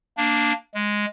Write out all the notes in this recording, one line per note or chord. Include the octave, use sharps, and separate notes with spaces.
A#3 D4
G#3